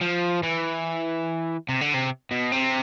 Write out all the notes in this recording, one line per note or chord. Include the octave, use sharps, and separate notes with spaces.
F3
E3
C3
D3
C3
B2
C3